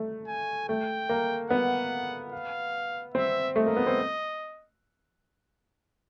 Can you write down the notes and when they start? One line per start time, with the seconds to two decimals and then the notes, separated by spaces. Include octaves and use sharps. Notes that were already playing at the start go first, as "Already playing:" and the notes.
Already playing: A3
0.28 G#5
0.69 A3 G5
1.09 A#3
1.50 B3 F#5
2.32 F5
3.14 C4 E5
3.56 A3 D#5
3.66 A#3
3.77 B3
3.86 C4